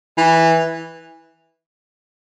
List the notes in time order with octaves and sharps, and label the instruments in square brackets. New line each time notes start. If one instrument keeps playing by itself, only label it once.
[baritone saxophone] E3